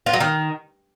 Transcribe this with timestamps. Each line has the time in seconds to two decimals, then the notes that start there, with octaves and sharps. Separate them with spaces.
0.06 F4
0.13 F#3
0.20 D#3